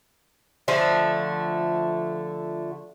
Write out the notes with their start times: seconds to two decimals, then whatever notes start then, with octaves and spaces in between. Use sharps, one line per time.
0.68 D3 F3 A3